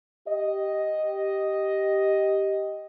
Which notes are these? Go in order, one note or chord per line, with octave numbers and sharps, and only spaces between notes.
G4 D#5